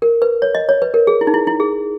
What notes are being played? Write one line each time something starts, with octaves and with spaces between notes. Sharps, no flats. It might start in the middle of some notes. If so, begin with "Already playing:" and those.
A#4
B4
C#5
D#5
C#5
B4
A#4
G#4
E4
D#4
E4
E4
G#4